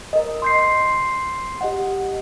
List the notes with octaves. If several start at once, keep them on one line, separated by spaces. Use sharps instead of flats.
A#4 D#5
C6 G6 C7
G4 D#5 F#5